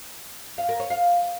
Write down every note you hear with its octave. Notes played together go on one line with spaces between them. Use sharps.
F5
A#4
C#5
F5